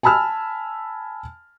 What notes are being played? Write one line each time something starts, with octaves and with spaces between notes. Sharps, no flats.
G#5 A5 B5 E6 F6